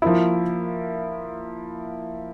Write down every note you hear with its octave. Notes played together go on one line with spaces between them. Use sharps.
F3 A#3 E4